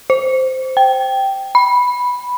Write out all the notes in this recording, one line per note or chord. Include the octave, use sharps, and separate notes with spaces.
C5
G5
B5